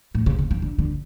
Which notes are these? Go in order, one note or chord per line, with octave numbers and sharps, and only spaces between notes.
A2
C#3
C#3
C#3
D3
D3